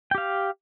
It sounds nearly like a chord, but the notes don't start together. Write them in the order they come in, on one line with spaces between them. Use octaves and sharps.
G5 G4 F5